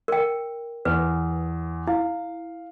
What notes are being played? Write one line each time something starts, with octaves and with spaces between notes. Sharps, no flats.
A#4 G5
E2 B4
E4 F5